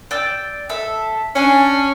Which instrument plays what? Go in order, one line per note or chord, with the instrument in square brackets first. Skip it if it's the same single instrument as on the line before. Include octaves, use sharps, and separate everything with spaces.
[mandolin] D5 G5 E6
A4 E5
[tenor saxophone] C#4 [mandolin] D4 G#5